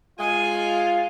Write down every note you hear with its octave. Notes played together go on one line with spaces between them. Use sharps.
G#3 F4 G#5